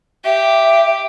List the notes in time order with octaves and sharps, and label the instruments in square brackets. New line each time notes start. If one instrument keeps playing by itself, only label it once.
[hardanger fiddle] G4 [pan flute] E5